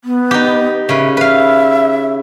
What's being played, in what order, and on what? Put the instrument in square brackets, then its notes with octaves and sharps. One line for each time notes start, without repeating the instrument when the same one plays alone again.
[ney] B3
[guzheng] D#4 G4
[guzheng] C#3 B4 [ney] E5
[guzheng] B4 F5 [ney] E5